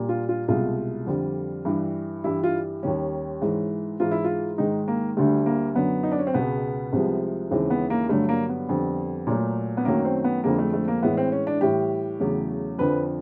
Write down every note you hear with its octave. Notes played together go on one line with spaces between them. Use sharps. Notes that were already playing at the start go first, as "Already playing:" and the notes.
Already playing: A#2 G3
F4
F4
C2 B2 G#3 F4
F2 D3 G3
G2 E3 G3
G2 E3 G3 E4
F4
D#2 D#3 G3 C#4
G#2 E3 G#3
G#2 E3 G#3 F4
E4
F4
G#2 D#3 G#3 D#4
A#3
D2 D3 G3 A3
A#3
F#2 D3 F#3 B3
D#4
D4
C#4
C4
C#2 B2 G#3 B3
C2 C3 F3 G#3
D#2 C#3 E3 G#3 C4
B3
A#3
G2 D3 F#3 A3
A#3
B3
F2 D3 G3
A#2 F#3 A3
B3
F#2 D#3 F#3 A3 A#3
C4
B3
F2 D3 F3 G#3 A#3
A3
A3
A#3
A2 E3 G#3 B3
C4
C#4
D4
A2 E3 G3 G4
E2 C#3 F#3 A3
F2 D3 F3 B4